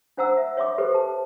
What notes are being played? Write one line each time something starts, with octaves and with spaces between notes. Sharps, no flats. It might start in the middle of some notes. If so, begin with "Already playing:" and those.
D4 C5 F#5 A#5 E6
E5
C#5 E5 C6 D6
G4 A4 B4 C5
A5